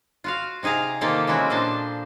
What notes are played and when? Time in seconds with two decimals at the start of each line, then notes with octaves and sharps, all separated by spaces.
0.24 F4 F#4 F5
0.63 C3 D#4 G#4 F5 A#5
1.01 C3 D#3 A#3 F4 G4 A4
1.27 C#3 G#3 C4 E4 F#4
1.50 A#2 F3 D4 A4 C5 A5